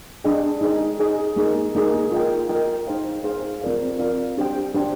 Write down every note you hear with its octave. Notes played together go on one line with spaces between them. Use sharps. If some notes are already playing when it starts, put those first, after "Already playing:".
D4 G#4 D#5 G5
D#4 G#4 D#5
D#4 G#4 D#5
A#3 D#4 G#4
A#3 D#4 G#4
F4 A#4 D#5 G5
F4 A#4 D#5 G5
D#4 G#4 C5 F5
D#4 G#4 C5 F5
C4 F4 A#4 D5 F5
C4 F4 A#4 D5 F5
D4 G4 C5 G5
D4 G4 C5 G5